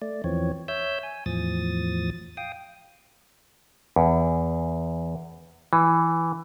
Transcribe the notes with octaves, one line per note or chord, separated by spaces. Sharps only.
A3 D5
E2 E3 F3 C4 C#5
C#5 E5 E6 G6
G#5
E2 A2 F3 D#6 A6
F5 G5 D#6
E2
E3